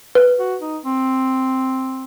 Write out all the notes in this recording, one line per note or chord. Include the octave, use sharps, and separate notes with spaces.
B4
F#4
D#4
C4